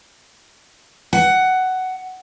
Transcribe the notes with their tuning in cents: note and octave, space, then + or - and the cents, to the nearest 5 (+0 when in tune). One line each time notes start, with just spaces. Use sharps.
F#5 +10